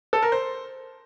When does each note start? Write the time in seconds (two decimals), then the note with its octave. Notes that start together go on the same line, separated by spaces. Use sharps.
0.13 A4
0.22 A#4
0.32 C5